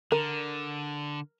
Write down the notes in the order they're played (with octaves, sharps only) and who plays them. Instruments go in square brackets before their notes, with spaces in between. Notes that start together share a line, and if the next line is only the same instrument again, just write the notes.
[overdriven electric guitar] D3 [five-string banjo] A#4